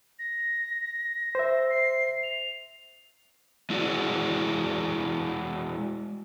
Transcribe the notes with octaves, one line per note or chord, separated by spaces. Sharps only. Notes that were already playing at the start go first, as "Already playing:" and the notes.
A#6
C5 E5
C7
F7
G#3 E4 F#4 G#4 D5